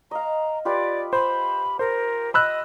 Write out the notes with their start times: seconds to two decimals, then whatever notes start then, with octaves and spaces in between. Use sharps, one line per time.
0.11 D#5 F5 A#5
0.65 F4 G4 B4 D5
1.13 C5 B5
1.79 A#4 C5
2.34 D#5 B5 E6 F#6